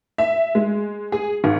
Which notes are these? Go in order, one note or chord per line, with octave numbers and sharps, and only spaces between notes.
E5
G#3
G#4
G#1